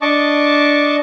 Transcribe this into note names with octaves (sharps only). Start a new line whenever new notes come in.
D4 D#5 A5 C#6 D6